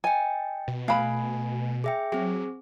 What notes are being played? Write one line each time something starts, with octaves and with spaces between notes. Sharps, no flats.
D#5 G5 G#5
B2
A3 F5 G#5 B5
G#4 E5 G5
F#3 C4 G#4